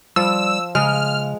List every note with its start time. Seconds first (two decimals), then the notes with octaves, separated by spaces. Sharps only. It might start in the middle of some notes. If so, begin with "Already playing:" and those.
0.16 F3 G3 E6
0.75 C#3 G#3 F6